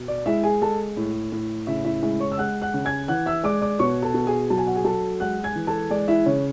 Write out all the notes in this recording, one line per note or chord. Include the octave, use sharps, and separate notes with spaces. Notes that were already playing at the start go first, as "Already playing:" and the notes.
Already playing: B2
D5
G#3 E4 E5
G#4 G#5
G#3 A4 A5
A2
A2
C#3 E4 E5
E4 E5
G#3 E4 E5
C#5 C#6
E6
G#3 F#5 F#6
F#5 F#6
C#3
G#5 G#6
E3 F#5 F#6
E5 E6
G#3 D5 D6
D5 D6
B2 C#5 C#6
A4 A5
B2
G#4 G#5
F#3 A5
G#5
F#5
G#4 G#5
F#3 A4 A5
G#3 F#5 F#6
G#5 G#6
E3
A4 A5
G#3 D5
E4 E5
C#3 C#5